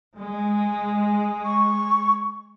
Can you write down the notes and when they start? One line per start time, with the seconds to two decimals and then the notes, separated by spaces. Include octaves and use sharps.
0.17 G#3
1.45 C#6